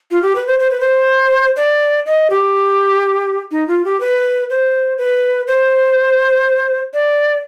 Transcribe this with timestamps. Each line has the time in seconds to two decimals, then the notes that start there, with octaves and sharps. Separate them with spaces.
0.11 F4
0.22 G4
0.35 B4
0.47 C5
0.59 C5
0.71 B4
0.80 C5
1.56 D5
2.06 D#5
2.30 G4
3.51 D#4
3.68 F4
3.85 G4
4.00 B4
4.50 C5
4.98 B4
5.47 C5
6.94 D5